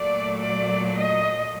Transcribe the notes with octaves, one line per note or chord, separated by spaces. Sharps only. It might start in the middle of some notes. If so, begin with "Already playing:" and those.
Already playing: A#2 F#3 A3 D5
D5
D#5